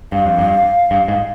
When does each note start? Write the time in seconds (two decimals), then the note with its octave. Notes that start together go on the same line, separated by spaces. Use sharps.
0.12 G2 F5
0.26 F2
0.38 G2
0.91 G2
1.08 G#2